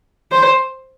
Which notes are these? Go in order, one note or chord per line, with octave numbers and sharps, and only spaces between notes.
C5